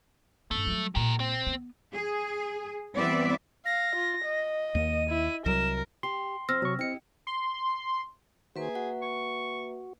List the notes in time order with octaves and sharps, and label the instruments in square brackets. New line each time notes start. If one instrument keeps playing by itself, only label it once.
[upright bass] G2 C#4 [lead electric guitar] A3
[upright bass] F#3 G3
[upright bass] A#1 A#2 [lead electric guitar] G4 A#4
[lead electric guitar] C4
[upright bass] A#3 B3
[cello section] G#4
E3 G3 B3 C4 D5 E5
[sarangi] F5 [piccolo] A#6
[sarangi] F4
D#5
[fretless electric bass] D#2 A#3 [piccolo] D#7
[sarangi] E4
[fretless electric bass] C2 F#3 [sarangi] A#4 [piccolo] E7
[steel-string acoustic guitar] G4 [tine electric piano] C6
[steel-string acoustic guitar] F2 C4 [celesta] E6 F6 A#6
[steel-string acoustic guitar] C3 [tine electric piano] F#3 C#6
[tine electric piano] C4 C#7 [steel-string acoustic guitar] E4 G4 D#5
[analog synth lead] C6
[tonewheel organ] D#3 F#4 C5 [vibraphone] A#3 B4 E5 [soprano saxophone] G#4
[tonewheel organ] F#4 [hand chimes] F#5
[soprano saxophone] C#6